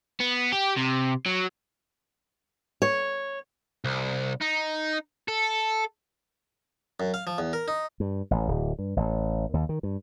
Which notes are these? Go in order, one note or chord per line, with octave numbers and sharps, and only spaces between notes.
B3
G4
C3
F#3
C#5
C2
D#4
A4
F#2
F5
F3
E2
A#4
D#4
G2
A1
D1
G2
A1
D#2
D#3
G2